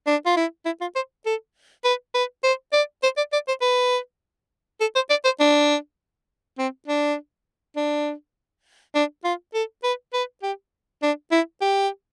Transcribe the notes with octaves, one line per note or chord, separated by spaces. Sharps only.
D4
F4
E4
E4
F4
C5
A4
B4
B4
C5
D5
C5
D5
D5
C5
B4
A4
C5
D5
C5
D4
C4
D4
D4
D4
F4
A4
B4
B4
G4
D4
E4
G4